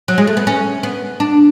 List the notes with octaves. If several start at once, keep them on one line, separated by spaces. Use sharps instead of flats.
F#3
G#3
A3
B3
C#4
B3
D4